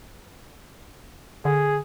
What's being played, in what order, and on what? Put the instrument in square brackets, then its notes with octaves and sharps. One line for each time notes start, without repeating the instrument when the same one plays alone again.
[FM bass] D3 [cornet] G#4